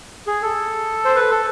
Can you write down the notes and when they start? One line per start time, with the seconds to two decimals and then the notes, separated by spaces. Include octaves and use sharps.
0.27 G#4
0.42 A4
1.05 C5
1.15 B4
1.31 A4